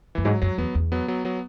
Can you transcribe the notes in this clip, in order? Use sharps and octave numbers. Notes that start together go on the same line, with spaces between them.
F#2 E3
G#2 F#3
F#2 F#3
E2 F#3 B3
E2
F#3 B3
F#3 B3
F#3 B3